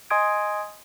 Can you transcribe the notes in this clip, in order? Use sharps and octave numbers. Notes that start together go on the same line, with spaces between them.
D#5 G#5 C6 D#6 G#6 D7